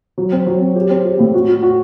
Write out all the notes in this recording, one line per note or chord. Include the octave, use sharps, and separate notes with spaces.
F#3
C4
F#3
C4
G4
C4
G4
A2
F#4
F#4
F#4